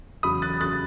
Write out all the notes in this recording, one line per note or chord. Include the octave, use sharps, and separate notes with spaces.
E2 C#3 F#3 B5 D#6
F#6 A6
C#3 F#3 F#6 A6